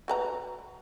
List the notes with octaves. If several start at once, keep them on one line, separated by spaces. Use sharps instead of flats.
F#4 B4 A#5